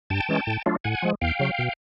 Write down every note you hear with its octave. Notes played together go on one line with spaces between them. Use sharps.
G2 G5 A5
E3 G#3 C#4
A2
F#3 A3 D4 F4
A2 F#5 G#5
F3 G#3
E2 F5 G5
C#3 F#3
B2